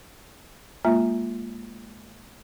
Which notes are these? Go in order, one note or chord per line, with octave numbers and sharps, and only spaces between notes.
G#3 A#3 F4 E5